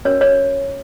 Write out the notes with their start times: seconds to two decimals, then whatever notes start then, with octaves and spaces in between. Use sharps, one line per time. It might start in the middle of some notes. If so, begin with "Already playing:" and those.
0.05 C#4 F#4 A#4 C#5
0.21 C#5